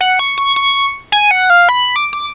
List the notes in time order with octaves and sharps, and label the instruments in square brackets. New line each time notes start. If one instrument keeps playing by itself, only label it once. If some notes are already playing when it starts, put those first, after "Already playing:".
[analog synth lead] F#5
C#6
C#6
C#6
G#5
F#5
F5
B5
D6
D6